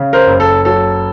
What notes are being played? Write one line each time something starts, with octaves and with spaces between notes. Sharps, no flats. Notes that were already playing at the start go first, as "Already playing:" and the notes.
Already playing: C#3
A#4 C5
F#1
A4
F#3 A4